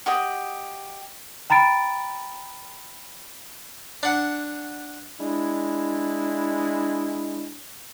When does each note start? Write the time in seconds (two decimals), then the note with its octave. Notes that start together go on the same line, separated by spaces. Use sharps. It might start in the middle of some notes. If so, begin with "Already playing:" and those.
0.06 F#4 G4 D#5 D#6
1.50 G5 A#5 B5 A6 D7
4.03 D4 F#5
5.21 G#3 D4 E4